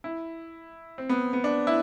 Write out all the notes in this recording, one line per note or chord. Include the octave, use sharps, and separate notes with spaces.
E4
C4
B3
B3
D4
E4